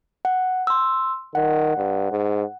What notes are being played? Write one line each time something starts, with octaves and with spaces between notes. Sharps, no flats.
F#5
C6 E6
D#3 F#5
G2
G#2